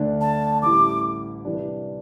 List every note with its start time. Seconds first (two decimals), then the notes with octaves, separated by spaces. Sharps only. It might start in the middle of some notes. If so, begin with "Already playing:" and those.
Already playing: D2 D3 A3 D4
0.21 A5
0.62 A1 A2 G3 E4 D6
1.45 C2 C3 E3 G3 D4